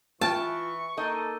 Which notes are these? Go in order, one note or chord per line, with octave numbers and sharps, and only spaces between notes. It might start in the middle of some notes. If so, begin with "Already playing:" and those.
E3 F4 G5 A5 C#6
A#3 D#4 A4 D#5